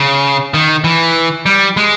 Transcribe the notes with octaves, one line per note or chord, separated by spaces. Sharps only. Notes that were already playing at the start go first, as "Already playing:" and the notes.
Already playing: C#3
D#3
E3
G3
G#3